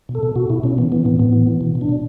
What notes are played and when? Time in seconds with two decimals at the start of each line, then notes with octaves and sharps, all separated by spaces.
0.09 B2
0.15 A4
0.23 B2
0.36 B2 F#4
0.50 B2 E4
0.64 B2 C#4
0.78 E3 B3
0.92 E3 B3
1.05 A2 B3
1.19 A2 B3
1.33 E3
1.47 E3
1.61 B2
1.75 B2
1.81 D4
1.89 B2